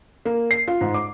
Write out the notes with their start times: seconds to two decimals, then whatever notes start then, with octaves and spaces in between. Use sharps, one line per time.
0.25 A#3
0.51 C7
0.68 F4
0.81 G#2
0.94 D6